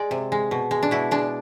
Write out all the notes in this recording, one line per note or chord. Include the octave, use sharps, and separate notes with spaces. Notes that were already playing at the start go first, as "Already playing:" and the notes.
Already playing: G#3 D5
C3
G#3
B2
G#3
D4
B2 E4
G#3 D4